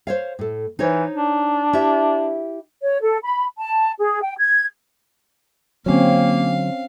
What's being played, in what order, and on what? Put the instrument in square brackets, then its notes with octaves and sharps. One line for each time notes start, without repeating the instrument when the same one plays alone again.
[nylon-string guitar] C5 C#5 F5
A2 A4
[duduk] E3 [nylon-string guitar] D#4 C5 C#5
[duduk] D4
[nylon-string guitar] E4 G4 E5
[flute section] C#5
A4
B5
A5
G#4
G5
G#6
[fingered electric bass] D3 F#3 [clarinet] A#3 [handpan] C4 C#4 C#5 [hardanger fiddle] F5